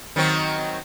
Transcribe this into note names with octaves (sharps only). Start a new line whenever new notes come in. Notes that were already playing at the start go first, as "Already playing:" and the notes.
D#3 F#3 C4